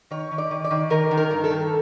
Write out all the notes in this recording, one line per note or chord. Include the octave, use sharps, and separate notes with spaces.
D#3 C#5
D#3
D5
D#3
D5
D#3
D#3 A#4
D#3
A#4
G2
A4
D#3